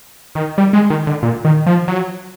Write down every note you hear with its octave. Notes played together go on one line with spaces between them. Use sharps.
D#3
G3
G#3
D#3
D3
A#2
D#3
F3
F#3